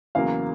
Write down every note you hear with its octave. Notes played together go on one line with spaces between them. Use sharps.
E2 C#3 F#3 A#3 F5